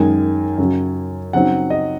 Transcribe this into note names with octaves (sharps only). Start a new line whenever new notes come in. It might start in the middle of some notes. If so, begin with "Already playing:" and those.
Already playing: F#2 D#3 G#3 D#4 G#5
F#2 C#3 F#3
C#3 F#3 C4 D#4 F#5
D#5